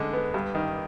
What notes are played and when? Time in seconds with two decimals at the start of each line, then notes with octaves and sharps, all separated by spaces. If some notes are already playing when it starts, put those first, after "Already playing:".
Already playing: D3 G#3
0.13 B3
0.34 G2
0.55 D#3